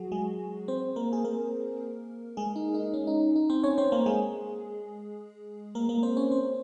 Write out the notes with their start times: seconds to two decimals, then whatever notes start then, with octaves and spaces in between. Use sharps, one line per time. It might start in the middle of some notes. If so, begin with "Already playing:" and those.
Already playing: F#3 F#4 G#4
0.12 G#3 G#4
0.68 C4 C5
0.96 A#3 A#4
1.13 G#4
1.24 A#3 A#4
2.37 G#3 G#4
2.56 D#4
2.75 D#4
2.94 C#4
3.07 D#4
3.36 D#4
3.50 C4 C5
3.64 C#4 C#5
3.78 C4 C5
3.92 A#3 A#4
4.06 G#3 G#4
5.75 A#3 A#4
5.89 A#3 A#4
6.03 C4 C5
6.17 C#4 C#5
6.31 C4 C5